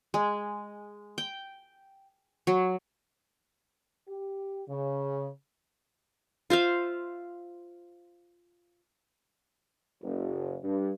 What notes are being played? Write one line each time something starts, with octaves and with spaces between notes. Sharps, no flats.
G#3
G5
F#3
G4
C#3
F4 C5 E5 F5
F#1
G2